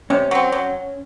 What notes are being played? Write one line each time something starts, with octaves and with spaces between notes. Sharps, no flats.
C3 C#4
F#3 C4
F#3